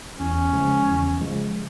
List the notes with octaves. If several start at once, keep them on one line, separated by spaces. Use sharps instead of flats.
E2 C#4
C#3 F3 G#3
E2
C#3 F3 G#3